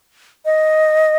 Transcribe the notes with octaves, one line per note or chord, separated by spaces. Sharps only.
D#5